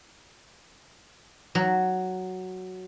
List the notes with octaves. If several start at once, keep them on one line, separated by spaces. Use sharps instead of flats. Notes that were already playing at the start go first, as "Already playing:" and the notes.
F#3